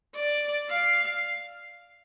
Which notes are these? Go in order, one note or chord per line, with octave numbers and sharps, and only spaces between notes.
D5
F5